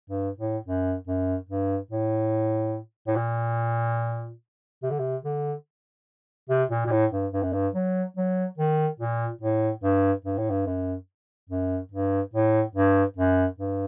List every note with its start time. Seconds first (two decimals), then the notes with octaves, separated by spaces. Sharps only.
0.10 G2
0.38 A2
0.66 F#2
1.07 F#2
1.49 G2
1.91 A2
3.07 A2
3.16 A#2
4.83 C3
4.91 D3
4.99 C3
5.25 D3
6.49 C3
6.71 A#2
6.86 A#2
6.91 A2
7.12 G2
7.33 G2
7.43 F#2
7.53 G2
7.74 F#3
8.17 F#3
8.58 D#3
8.99 A#2
9.41 A2
9.83 G2
10.25 G2
10.38 A2
10.50 G2
10.66 F#2
11.49 F#2
11.92 G2
12.33 A2
12.75 G2
13.17 F#2
13.58 G2